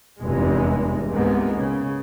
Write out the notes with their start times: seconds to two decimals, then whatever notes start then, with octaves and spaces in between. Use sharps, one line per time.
0.21 F1 E2 G2 E3 G#3
1.11 C#2 G#2 C3 G#3 A#3 B3
1.57 C#3